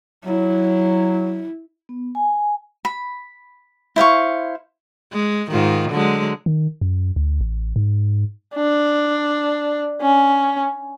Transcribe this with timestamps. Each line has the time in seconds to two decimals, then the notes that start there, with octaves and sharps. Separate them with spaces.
0.25 F#3 E4
1.89 B3
2.15 G#5
2.85 B5
3.96 E4 C5 F5 C#6
5.13 G#3
5.51 G#2 D#3 F4
5.91 D3 F#3 G#3
6.46 D#3
6.81 F#2
7.16 D2
7.41 A1
7.76 G#2
8.55 D4
10.01 C#4